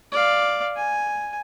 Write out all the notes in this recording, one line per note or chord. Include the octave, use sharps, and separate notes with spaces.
D5 F5
G#5